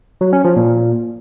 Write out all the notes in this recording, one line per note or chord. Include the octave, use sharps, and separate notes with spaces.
F#3
C#4
F3
A#2